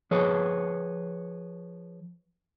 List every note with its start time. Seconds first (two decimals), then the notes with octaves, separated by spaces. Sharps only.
0.11 F3 G#4 B4 C#5